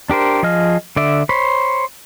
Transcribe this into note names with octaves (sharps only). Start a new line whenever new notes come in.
D4 G4 A#4 C5
F3 G#4 D#5 F6
D3 D5 E5
C5 C#5 B5